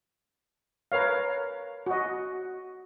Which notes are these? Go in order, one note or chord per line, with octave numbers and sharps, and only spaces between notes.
A#4 B4 C#5 F5
F#4 D#5